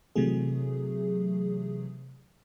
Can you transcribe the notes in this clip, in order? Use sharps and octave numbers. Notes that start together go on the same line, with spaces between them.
C3 E3 F#3 A3 G#4